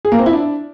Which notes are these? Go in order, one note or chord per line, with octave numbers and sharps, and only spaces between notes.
G#4
A#3
C4
E4
D4